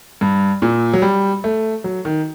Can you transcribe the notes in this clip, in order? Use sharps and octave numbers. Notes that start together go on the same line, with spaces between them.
G2
A#2
F#3
G3
A3
F#3
D#3